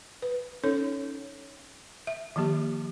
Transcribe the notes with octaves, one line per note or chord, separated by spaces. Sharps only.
B4
C#4 D#4 A4 C#5
E5
D#3 F3 A#3 G4